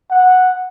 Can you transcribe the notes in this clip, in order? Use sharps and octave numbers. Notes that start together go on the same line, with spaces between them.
F#5